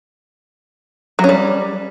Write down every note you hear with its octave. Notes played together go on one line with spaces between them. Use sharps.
F#3
C#4
G3